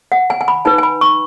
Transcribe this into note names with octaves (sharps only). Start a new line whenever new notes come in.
F#5
G#5
G#5
B5
D#4 B4 G#5
G#5
B5
C#6